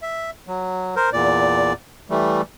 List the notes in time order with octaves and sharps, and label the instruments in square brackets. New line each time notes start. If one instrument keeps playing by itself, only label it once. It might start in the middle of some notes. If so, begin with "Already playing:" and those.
[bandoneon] E5
F#3
A#4 C5
E2 A#2 D5
E3 G3 A3